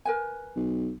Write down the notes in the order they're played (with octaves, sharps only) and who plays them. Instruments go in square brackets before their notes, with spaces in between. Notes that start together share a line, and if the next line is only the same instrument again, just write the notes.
[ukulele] A#4 B4 G#5
[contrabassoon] B1